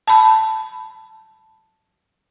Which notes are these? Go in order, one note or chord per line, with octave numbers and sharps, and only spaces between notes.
A5 B5